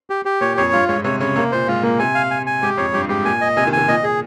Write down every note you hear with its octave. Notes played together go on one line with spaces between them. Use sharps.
G4
G4
A#2 C#5
F2 C#5
G2 F4
G#2 C#5
C3 C#5
C#3 C#5
C3 A#3
A#2 C5
G#2 F4
A#2 A#3
C3 G#5
F5
G#5
G#5
G#2 G4
F2 C#5
G2 G4
G#2 G4
A#2 G#5
D#5
C3 G#5
D#3
C3 G#5
A#2 D#5
G#4